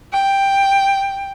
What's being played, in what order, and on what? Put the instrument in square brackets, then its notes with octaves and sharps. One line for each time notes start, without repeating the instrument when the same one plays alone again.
[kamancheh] G5